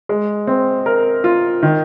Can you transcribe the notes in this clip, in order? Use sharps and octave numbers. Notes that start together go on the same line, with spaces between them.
G#3
C4
A#4
F4
D#3